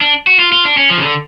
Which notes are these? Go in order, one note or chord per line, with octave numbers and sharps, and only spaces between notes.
D4
F#4
F4
F4
D4
C#4
F3
C#3
D3